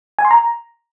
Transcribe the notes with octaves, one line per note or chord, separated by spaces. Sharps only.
G#5
C6
A#5